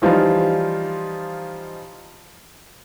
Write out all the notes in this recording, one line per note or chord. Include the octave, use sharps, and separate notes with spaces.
E3 F3 G3 D#4 F4